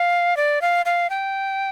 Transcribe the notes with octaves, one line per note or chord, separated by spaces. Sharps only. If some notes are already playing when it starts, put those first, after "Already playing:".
Already playing: F5
D5
F5
F5
G5